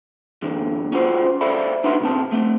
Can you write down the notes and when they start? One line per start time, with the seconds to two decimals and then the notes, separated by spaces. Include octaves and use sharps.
0.42 F#2 D3 E3
0.92 C#4 F4 F#4 C5
1.41 A4 C5 D5 E5 F5 B5
1.84 D4 D#4 F#4 B4 E5 C6
2.01 B1 F#2 C4 A5
2.32 A3 C4